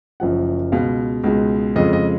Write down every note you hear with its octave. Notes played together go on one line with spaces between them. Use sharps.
F#1 F#2 F3 F#5
C#2 B2 G#3 F5
C#2 B2 G#3
F2 C#3 G#3 D#5
D#5